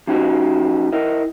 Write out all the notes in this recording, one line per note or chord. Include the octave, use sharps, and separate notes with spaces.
F3 C#4 D#4 F#4 G4
E4 A#4 D#5